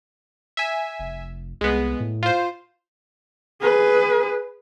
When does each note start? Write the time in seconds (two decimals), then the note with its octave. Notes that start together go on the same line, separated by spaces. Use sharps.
0.57 E5 G#5
0.99 F1
1.61 C2 G#3 B3
2.00 A2
2.23 F4 C5
3.62 G#4 B4